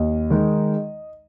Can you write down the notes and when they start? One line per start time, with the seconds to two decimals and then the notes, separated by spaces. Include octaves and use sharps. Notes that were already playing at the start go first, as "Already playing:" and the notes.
Already playing: D#2 D#5
0.30 D#3 G#3 D#4